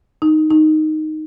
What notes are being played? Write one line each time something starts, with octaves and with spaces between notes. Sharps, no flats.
D#4
D#4